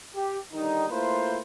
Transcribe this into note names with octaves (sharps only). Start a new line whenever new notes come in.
G4
D3 D#3 G3 D#4
A3 A#3 E4 F4 B4 C5